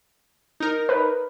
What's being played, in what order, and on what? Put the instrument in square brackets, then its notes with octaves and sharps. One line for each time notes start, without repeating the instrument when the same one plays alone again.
[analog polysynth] D#4 A#4
[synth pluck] B4